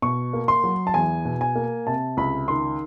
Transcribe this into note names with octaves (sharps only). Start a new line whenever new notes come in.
B2 C#6
A#3
C6
F#3
A5
E2 G#5
B2
G#5
A#3
C3 A5
C#2 B5
D#3 C6